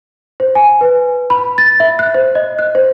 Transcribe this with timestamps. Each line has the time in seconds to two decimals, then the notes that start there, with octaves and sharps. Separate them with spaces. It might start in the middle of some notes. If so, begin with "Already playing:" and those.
0.40 C5
0.55 G#5
0.81 B4
1.30 B5
1.58 A6
1.80 E5
1.99 F#6
2.14 C5
2.35 D#5
2.59 F#6
2.75 C5